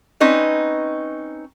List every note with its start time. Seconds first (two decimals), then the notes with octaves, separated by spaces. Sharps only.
0.20 C4 C#4 D#4 B4 D#5